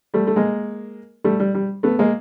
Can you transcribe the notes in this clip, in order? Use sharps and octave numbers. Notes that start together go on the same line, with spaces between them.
G3 A3
A3
G#3 A#3
G3 A3
G3
G3
A3 B3
G#3 A#3